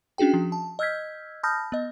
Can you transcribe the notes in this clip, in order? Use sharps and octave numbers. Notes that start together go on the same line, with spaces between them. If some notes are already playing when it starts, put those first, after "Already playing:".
C#4 D4 F#4 G#4 G5
F3
A5
D#5 E6 F6 G6 G#6 B6
A5 B5 D#6 F6 G6 A#6
B3 D#5